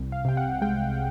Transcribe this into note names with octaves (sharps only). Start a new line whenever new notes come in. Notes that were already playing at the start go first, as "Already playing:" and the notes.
Already playing: C2
F5
C3 G5
F#5
G#3 G5